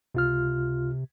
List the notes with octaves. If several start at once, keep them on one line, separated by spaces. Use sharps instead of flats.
C#2 C3 F4 F6